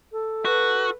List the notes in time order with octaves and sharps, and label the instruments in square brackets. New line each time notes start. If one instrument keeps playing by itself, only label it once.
[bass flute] A4
[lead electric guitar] F#4 [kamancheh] B4